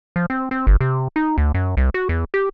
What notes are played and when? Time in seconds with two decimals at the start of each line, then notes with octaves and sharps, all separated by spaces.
0.16 F3
0.30 C4
0.51 C4
0.67 G1
0.81 C3
1.16 D#4
1.38 D2
1.54 F#2
1.77 C2
1.94 F#4
2.09 E2
2.34 G4